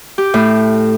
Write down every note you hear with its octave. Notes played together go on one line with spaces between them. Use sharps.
G4
A2